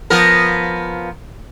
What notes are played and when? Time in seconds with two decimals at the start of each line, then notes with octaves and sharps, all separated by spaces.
0.10 F3 B3 A#4